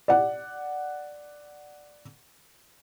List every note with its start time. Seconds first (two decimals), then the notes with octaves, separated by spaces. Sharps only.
0.08 D5 F#5